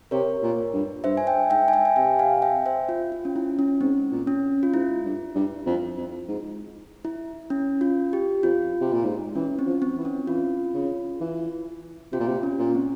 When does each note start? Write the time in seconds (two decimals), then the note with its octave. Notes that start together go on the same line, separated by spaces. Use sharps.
0.11 C3 A#4 C#5
0.43 A#2
0.73 G2
1.04 G2 C5 E5
1.17 G#5
1.27 E5 G5
1.50 G#2 E5 G5
1.68 G#5
1.73 E5 G5
1.85 G#5
1.96 C3 E5 G5
2.19 F5 G#5
2.42 E5 G5
2.66 C5 E5
2.89 F4
3.12 F4
3.25 C#4
3.36 E4
3.59 C#4
3.81 G#2 C4
4.12 A#2
4.27 C#4
4.63 F4
4.74 G#2 E4
5.05 G2
5.35 G2
5.66 F2
5.97 F2
6.28 G#2
7.05 E4
7.50 C#4
7.81 F4
8.13 G4
8.43 F2 F4
8.81 C3
8.93 A#2
9.05 G#2
9.36 E3 C#4
9.59 C4
9.66 F3
9.82 C4
9.97 E3
10.05 C#4
10.27 E3 F4
10.74 C#3
11.21 E3
12.12 C3 F4
12.20 A#2
12.28 C3
12.43 C#4
12.59 A#2
12.75 C4